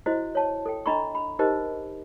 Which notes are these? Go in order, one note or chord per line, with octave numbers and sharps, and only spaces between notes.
E4 F#4 C5 D#5
C#5 A5
A4 G5
D4 D#5 A#5 B5 C#6
B5
D#4 G4 A#4 C5 D#5